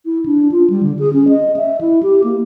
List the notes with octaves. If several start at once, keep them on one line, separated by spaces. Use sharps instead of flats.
E4
D4
F4
G3
D3
G#4
C#4
D#5
E5
E4
G4
A#3